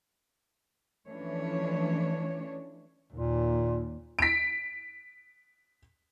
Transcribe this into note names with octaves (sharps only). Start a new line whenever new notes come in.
E3 F3 A3 C#4 D4 C#5
D#2 A#2
B6 D7